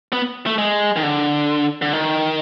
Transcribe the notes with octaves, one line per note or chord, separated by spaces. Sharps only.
B3
A3
G#3
D#3
D3
D3
D#3